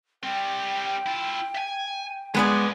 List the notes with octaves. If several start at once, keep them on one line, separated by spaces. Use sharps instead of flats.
G3 C4 G5
E4 F4
E5 G#5
G2 F3 G#3 B3 D5 G#5